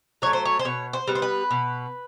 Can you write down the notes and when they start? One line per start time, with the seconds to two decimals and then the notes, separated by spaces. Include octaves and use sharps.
0.22 F#3 A3 C#5
0.33 C5
0.45 C#5
0.59 C5
0.65 B2 C#5
0.93 C5
1.07 G3 B3
1.15 C5
1.22 B4
1.51 B2